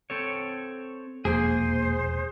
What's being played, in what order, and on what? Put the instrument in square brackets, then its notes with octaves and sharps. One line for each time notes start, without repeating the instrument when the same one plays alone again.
[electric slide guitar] C4 A4 C#5
[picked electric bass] E1 A#1 F2 [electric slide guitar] A#3 [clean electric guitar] G#4 [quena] C5